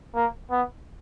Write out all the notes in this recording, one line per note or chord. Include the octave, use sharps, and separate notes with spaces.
A#3
B3